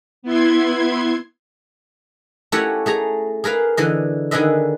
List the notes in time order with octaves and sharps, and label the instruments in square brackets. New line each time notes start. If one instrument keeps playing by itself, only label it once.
[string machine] B3 E4 C6 G#6
[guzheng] A3 C#4 E4 F#4 G4 C#5
A3 G#4 A#5
G#4 A#4 B4 F5
D3 E3 D#5
D3 D#3 G#4 B4 D#5 E5